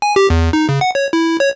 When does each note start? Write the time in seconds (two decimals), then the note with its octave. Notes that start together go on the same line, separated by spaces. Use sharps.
0.02 G#5
0.16 G4
0.30 E2
0.53 D#4
0.69 C#3
0.81 F#5
0.95 C#5
1.13 E4
1.40 C#5